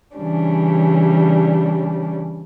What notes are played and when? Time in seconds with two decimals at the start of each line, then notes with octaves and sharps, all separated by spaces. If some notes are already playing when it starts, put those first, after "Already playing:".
0.17 C#3 E3 G3 C#4 D4